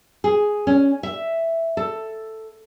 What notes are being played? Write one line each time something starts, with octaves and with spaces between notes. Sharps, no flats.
G#4
C#4
E5
A4